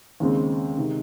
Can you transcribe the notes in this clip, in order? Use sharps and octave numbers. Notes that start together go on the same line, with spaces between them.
D#2 C#3 G#3 C4
C3 D#3 G#3